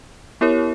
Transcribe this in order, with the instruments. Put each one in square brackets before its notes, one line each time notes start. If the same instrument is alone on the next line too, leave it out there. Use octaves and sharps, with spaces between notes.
[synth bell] B3 E4 G4 A#4 C#5